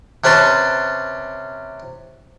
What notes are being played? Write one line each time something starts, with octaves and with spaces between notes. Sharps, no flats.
C3 C#4 B4 A5 C6